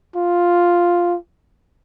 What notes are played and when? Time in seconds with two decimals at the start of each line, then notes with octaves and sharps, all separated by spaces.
0.15 F4